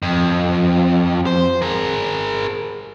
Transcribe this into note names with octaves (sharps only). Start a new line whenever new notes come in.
F2
C5
G#4 A#4